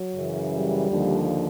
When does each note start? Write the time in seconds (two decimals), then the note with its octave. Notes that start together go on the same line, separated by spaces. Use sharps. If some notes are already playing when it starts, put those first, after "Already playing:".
Already playing: F#3
0.16 F#2 C#3 E3
0.53 G3
0.90 D#2 D3 F3